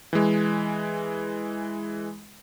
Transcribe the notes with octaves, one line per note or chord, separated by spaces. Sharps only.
E3 G#3